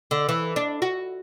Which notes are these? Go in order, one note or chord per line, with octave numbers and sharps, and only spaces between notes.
D3
E3
D4
F#4